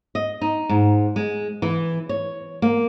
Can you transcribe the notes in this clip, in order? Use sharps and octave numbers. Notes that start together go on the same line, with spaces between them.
D#5
D#4
G#2
G#3
E3
C#5
A#3